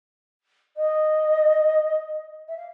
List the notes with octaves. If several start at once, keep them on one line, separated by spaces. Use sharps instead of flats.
D#5
E5
F5